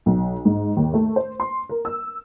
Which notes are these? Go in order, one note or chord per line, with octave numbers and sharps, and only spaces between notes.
B1
G#2
D#2
A3
C5
C6
A#4
E6